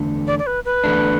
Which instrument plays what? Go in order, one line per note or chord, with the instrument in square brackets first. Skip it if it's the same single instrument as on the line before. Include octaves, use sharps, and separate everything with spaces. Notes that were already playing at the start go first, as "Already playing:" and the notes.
Already playing: [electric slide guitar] E2 D3 A3 D4
[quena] D5
D5
B4
B4
[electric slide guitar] E2 D3 A3 D4